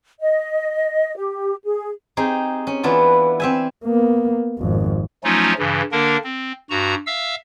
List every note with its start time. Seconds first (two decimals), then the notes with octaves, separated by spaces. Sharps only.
0.20 D#5
1.16 G4
1.64 G#4
2.17 C4 D#4 G4 G#4
2.67 C#4
2.83 E3 B3 D4 E4 F4
3.40 C4 E5 G#5
3.85 A#3 B3
4.58 G#1 F2
5.24 F3 F#3 A3 C#4 D#4 F4
5.58 G2 C#3 E3
5.92 D3 A#3 D4 A#4
6.24 C4
6.70 G2 F#4 A#5
7.07 E5 F5 E6